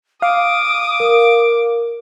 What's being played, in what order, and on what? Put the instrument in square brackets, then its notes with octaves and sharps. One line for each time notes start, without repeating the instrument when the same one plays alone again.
[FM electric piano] F5 [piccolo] D6 [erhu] D#6
[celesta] A#4